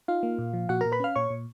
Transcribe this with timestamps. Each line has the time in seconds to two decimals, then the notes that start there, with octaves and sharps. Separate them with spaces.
0.08 D#4 F4 F5
0.23 A#3
0.38 A#2
0.53 F3
0.69 A#2 F#4 F#5
0.81 A#2 A#4 A#5
0.92 B4 B5
1.00 C#4 F5 F6
1.16 A#2 C#5 C#6
1.30 A#2